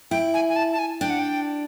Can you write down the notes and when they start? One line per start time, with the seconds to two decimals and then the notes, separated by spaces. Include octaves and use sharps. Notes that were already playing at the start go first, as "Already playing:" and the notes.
0.11 E4 G5
0.34 G#5
0.49 G#5
0.56 A5
0.73 A5
0.79 G#5
1.01 D4 G5
1.10 F#5
1.19 G5